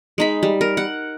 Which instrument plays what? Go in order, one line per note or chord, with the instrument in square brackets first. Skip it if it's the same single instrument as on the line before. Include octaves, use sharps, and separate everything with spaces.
[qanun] G#3 D#4 B5
G3
A#4
F#5